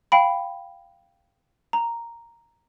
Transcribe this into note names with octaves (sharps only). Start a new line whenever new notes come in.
F5 G5 B5
A#5